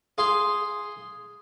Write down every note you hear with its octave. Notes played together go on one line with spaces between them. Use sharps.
G#4 F5 C6